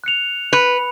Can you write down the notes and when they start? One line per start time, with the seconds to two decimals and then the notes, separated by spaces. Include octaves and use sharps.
0.04 F#6 C#7 F7
0.53 B4 F#6 C#7 F7